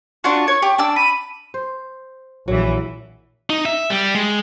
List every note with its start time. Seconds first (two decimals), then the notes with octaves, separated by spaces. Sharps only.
0.24 D4 F4 F#4 C#6
0.48 C#5
0.62 G4
0.78 D4 D6 E6
0.96 B5 D#7
1.54 C5
2.48 A#1 E3 F#3
3.50 D#4
3.65 E5
3.90 G3
4.15 G#3